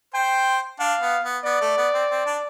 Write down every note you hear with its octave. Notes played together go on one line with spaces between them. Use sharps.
C5 G5
D4 F5
B3
B3
B3 D5
A3
B3
C4
C4
D4